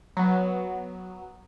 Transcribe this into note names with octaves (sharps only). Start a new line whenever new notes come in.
F#3 B3